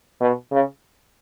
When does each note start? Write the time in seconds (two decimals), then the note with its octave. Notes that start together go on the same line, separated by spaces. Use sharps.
0.21 B2
0.52 C#3